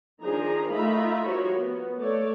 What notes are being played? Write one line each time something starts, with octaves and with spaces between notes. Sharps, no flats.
D#3 F3 D4 D#4 G#4 A#5
A3 D#4 F4 E5 A#5 B5
F3 G3 F#4 A#4 C#5
B3
A3 A4 C#5 D5